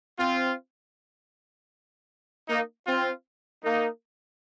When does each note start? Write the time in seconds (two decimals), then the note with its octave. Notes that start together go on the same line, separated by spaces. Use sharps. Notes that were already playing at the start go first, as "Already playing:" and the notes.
0.19 C4 F4
2.49 A#3 D#4
2.87 C4 F4
3.64 A#3 D#4